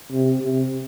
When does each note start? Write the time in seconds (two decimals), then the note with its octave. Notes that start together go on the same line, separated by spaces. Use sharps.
0.11 C3
0.41 C3